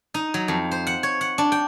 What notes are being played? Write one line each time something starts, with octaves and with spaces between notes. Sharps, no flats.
D#4
F#3
F2
C5
F#5
C#5
F#5
D4
G5